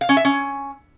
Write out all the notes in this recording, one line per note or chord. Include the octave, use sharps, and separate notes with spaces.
F5
C#4
E5
C#4